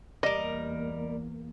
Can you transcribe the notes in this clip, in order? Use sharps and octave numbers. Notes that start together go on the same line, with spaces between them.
E2 G3 A#3 A#4 D#5